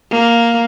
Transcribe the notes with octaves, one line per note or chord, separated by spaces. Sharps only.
A#3